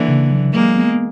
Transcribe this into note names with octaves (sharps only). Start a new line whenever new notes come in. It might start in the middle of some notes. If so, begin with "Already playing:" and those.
Already playing: D3 E3 A#3
C#3
F#3
F#3 G#3 A#3
B3